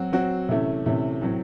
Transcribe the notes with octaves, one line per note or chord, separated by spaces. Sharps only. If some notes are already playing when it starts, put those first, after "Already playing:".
Already playing: F#3 C4 F#4
F#3 C4 F#4
C3 E3 A3 C#4
C3 E3 A3 C#4
A2 F#3 C4